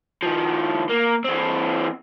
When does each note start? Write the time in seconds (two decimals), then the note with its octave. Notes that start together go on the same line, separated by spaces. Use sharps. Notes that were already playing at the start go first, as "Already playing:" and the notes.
0.22 D#3 F3
0.90 A#3
1.25 E3 C4